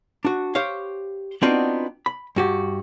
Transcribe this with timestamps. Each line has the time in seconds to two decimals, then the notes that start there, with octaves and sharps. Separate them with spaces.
0.25 D4 F#4
0.55 G4 C5 C#5 F5
1.42 B3 C4 D4 D#4 F4 F#4
2.06 B5
2.36 G2 F#4 G4